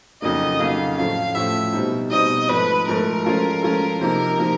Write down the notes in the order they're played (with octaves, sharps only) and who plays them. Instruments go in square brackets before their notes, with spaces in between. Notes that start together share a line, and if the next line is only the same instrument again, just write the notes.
[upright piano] F2 C#3 F#3 A#3 D#4 [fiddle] D#5
[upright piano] F2 C#3 F#3 A#3 D#4 [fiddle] F5
[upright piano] A2 F3 A3 C#4 [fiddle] F5
[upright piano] A2 F3 A3 C#4 [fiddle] E5
[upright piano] B2 G3 C4 D#4
[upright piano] B2 G3 C4 D#4 [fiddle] D#5
[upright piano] G#2 F3 A3 [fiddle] B4
[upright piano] G#2 F3 A3 [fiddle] A#4
[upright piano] F3 G#3 C#4 F4 A4
F3 G#3 C#4 F4 A4
[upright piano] C3 F3 A#3 D#4 [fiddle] A#4
[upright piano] C3 F3 A#3 D#4